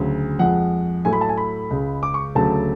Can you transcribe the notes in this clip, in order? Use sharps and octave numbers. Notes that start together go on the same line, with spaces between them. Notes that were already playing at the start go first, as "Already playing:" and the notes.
Already playing: D2 C#3 F#3
F2 F3 G#3 F#5
A2 F#3 A3 G#5
B5
A5
G#5
B5
C#2 C#3 G#3
D6
C#6
D2 C#3 F#3 A3 A5